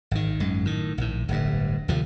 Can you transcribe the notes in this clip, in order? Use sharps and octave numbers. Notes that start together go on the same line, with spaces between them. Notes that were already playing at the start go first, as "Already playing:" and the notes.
G#1 D#3
G#1 F#2 G#3
A2 D#3
A#1 A2
D1 G1 G2
D2 C3 F3